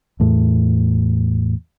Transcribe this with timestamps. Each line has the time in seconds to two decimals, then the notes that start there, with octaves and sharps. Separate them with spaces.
0.20 E2 A2